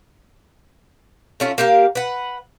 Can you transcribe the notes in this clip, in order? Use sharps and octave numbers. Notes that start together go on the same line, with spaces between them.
A3 C#4 F4
A#3 G4 A#4 F5
B4 F#5